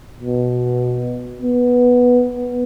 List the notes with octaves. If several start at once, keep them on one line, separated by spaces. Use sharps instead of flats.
B2
B3